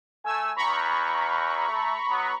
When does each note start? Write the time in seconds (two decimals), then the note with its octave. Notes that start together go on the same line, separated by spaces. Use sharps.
0.24 A3 G#5 E6
0.56 E2 A#5 B5 C#6
1.67 A3
2.08 F#3 B3